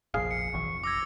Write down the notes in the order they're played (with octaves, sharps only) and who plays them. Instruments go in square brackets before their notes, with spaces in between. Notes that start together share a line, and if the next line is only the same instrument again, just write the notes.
[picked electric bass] F1 A#1 F2 [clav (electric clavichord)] G#4 F5 [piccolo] C7
[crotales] C#7
[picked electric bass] F#1 B1 E3 [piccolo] C#6
[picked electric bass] F1
[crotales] D6 E6 G#6 [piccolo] A#6